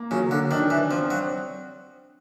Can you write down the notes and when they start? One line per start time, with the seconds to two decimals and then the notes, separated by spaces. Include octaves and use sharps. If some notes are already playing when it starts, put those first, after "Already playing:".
Already playing: A#3
0.11 C#3 F#3
0.31 D3
0.51 D#3 D4
0.70 E3
0.90 F3 C4
1.10 F#3